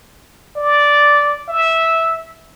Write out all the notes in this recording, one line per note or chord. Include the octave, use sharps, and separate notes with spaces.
D5
E5